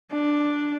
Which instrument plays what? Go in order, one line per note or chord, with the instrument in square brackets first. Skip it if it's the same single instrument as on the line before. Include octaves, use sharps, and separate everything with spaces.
[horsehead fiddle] D4